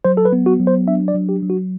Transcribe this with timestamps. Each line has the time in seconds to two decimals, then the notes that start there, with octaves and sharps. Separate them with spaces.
0.05 F#3 C5
0.17 A4
0.25 B4
0.33 B3
0.46 F#4
0.60 F#3
0.67 C5
0.87 D4 E5
1.08 D5
1.15 F#3
1.29 G4
1.43 F#3
1.50 F#4